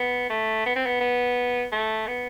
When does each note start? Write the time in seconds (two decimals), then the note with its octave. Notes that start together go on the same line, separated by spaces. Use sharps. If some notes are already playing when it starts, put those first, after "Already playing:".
Already playing: B3
0.30 A3
0.65 B3
0.76 C4
0.86 B3
1.01 B3
1.72 A3
2.07 B3